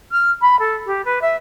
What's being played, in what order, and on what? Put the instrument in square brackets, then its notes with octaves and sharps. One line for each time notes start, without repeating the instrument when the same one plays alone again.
[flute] F6
B5
A4
G4
B4
E5